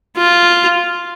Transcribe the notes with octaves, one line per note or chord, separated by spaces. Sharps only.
F4